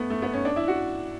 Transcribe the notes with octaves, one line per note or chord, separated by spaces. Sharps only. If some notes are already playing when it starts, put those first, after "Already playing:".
Already playing: A3 B3
A3
B3
C#4
D4
E4
F#4